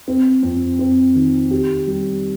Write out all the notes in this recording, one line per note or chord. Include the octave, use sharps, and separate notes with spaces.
C4
F2
C4
D#3
G4
G3